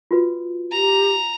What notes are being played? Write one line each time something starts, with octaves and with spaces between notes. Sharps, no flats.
F4 F#4 B4
G4 A#5